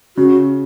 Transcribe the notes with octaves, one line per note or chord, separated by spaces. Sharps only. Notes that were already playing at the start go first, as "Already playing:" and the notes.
C#3 F#4